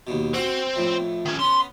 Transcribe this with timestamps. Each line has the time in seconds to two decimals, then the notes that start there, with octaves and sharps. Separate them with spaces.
0.07 D#2 B2
0.34 C4 F#4 F#5
0.76 F2 A2
1.26 D#3 C#4
1.40 B3 C#4 C6